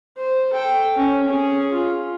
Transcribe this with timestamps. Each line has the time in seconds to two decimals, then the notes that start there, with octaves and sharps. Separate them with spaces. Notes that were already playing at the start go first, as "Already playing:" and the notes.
0.17 C5
0.53 A4 G5
0.96 C#4
1.28 C#4 G#4
1.72 F4